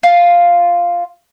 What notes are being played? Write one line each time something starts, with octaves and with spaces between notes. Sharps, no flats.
F4